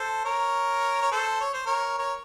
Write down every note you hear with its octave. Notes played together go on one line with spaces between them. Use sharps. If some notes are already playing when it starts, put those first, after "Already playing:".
Already playing: A4 C5
A#4 C#5
C#5
A4 C5
C#5
C5
A#4 C#5
A#4 C#5